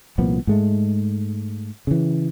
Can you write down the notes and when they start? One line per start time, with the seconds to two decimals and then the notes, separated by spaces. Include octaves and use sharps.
0.18 C2 A#2 F3 B3
0.47 G#2 G#3 A3
1.87 C#3 E3